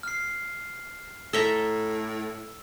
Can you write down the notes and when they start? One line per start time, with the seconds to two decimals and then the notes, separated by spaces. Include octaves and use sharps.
0.03 F6 C7
1.33 A2 A4 E5 A#5 E6